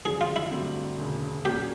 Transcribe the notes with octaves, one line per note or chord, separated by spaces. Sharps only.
F#2 D3 F3 G#4
F4
E4
G2 D3 F#3 A3 C4
E1 D2 C#3
A#2 F#3 A#3 C#4 G4